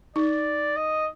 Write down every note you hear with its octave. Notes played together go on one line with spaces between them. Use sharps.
D#4 D5
D#5